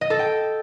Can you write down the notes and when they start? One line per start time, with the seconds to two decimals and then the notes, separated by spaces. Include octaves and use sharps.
0.01 D#5
0.10 A4
0.19 G5